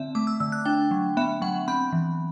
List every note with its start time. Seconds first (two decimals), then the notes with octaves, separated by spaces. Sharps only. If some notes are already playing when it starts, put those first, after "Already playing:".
Already playing: D3 C4 E5
0.15 A3 D6
0.27 E6
0.40 D3 E6
0.52 F#6
0.65 D4 G5
0.91 F#3
1.17 B3 E5
1.42 F#3 F#5
1.68 C4 B5
1.93 E3